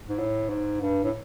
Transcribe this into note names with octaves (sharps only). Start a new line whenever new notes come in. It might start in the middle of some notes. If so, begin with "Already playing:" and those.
G#2
A2
G#2
G2
A2